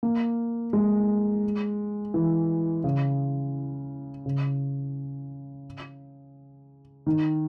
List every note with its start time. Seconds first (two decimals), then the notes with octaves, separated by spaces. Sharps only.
0.03 A#3
0.73 G#3
2.14 E3
2.84 C#3
4.26 C#3
7.07 D#3